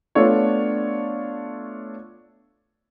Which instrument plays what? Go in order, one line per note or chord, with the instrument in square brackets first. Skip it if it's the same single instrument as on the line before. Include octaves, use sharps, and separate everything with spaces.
[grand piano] A3 B3 D4 F4 A4 C#5